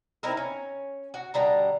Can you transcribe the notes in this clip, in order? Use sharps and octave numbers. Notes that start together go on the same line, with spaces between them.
C4 D#4 E4 A#4
C#4
F#4
B2 D3 G3 A#5